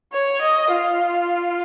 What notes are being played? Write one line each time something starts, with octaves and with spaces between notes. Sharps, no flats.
C#5
D#5
F4